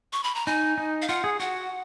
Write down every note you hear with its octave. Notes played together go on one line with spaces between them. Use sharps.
C#6
B5
A#5
D#4 G#5
D#4
F5
F4 F#5
G#4
F#4 F#5